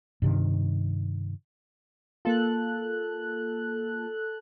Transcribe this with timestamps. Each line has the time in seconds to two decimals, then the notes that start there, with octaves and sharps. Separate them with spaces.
0.22 G2 C3 D#3
2.25 A#3 F4 A4 F#6